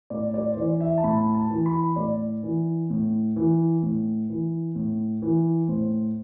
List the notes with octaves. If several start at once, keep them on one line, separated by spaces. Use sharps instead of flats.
A2 D5
D5
C5
E3 D5
E5
A5
A2 B5
A5
E3
B5
A2 D5
E3
A2
E3
A2
E3
A2
E3
A2 C5